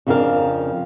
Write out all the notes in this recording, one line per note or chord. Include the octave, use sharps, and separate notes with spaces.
F2 C#3 F3 D4 A#4 F5